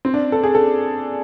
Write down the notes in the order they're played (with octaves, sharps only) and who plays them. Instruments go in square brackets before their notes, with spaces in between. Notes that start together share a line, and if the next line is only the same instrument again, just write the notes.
[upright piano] C4
D4
A4
G#4
A4